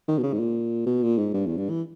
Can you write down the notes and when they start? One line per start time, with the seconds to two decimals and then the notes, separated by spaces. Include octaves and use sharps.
0.08 D#3
0.18 B2
0.23 C#3
0.33 G#2
0.39 A#2
0.86 B2
1.03 A#2
1.18 G#2
1.34 G2
1.46 E2
1.57 G2
1.70 E3